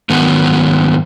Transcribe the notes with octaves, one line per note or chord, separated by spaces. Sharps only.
G#2 D#3 F#3 B3 F#4